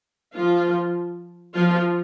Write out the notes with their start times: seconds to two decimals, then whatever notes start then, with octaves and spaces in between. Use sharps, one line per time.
0.35 F3 F4
1.55 F3 F4